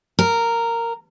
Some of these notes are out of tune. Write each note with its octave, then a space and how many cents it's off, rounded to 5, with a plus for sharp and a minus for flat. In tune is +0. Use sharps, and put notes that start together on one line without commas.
A#4 -10